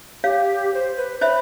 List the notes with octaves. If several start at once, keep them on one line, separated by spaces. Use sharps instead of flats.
G4 C#5 F5
C5
B4
C5 C#5 E5 B5